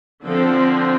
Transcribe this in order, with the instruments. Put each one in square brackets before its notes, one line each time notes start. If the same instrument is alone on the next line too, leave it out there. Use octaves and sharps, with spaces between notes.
[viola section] D3 F3 C4 A4